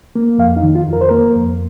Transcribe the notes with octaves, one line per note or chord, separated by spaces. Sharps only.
A#3
F2 F5
D#4
D#3
F4
F2
A#4
C5
A#3 A#4
F2